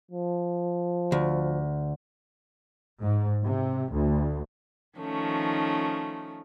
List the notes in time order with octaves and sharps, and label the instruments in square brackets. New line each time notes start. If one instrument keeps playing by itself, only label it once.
[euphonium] F3
[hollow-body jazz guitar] D2
[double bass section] G#2
C3
D2
[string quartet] D#3 F3 A3 C#4